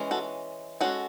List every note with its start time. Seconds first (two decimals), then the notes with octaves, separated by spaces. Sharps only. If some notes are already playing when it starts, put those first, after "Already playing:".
Already playing: E3 G#3 C#4
0.11 F#4 A4
0.80 G#3 C#4 F#4 A4